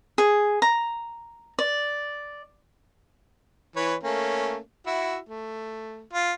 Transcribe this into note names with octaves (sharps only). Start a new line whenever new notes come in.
G#4
A#5
D5
E3 B4 C#5
A3 A#3 C#4
E4 F#4 E5
A3
F4